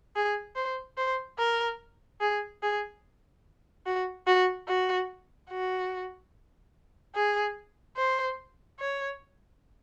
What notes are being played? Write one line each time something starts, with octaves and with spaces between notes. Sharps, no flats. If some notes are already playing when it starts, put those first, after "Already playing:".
G#4
C5
C5
A#4
G#4
G#4
F#4
F#4
F#4
F#4
G#4
C5
C#5